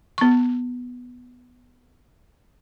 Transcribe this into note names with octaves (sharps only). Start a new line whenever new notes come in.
B3 C#6